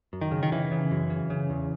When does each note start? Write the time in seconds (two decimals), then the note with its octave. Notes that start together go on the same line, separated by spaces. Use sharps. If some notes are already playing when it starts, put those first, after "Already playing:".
0.13 F#2
0.21 D#3
0.31 C#3
0.43 D#3
0.52 C#3 E3
0.72 C#3
0.91 F#2
1.10 C#3
1.30 C#3
1.50 E2